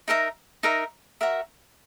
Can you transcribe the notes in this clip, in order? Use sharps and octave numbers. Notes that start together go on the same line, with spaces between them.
D#4 A#4 E5 A#5
D#4 A#4 E5 A#5
F#4 A#4 E5